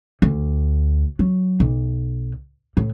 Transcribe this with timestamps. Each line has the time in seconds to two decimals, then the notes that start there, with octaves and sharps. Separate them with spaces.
0.22 D2
1.19 F#3
1.60 B1
2.77 A2